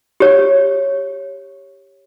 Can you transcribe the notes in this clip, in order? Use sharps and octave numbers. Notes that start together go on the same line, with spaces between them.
G4 C#5